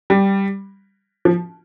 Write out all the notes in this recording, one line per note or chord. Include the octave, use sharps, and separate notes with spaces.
G3
F3